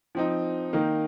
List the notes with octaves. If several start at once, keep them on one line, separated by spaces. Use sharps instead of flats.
F3 C4 D#4
D#3 A#3 D#4